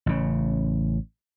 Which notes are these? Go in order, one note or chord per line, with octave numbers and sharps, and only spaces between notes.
A1 C#3